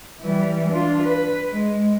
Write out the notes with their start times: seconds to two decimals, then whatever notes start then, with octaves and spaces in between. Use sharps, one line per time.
0.21 E3 G3
0.70 D4 F4
1.03 B4
1.49 G#3